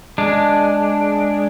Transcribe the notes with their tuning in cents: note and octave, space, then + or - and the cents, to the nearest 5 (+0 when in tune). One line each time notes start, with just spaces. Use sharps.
G#3 +0 D4 +0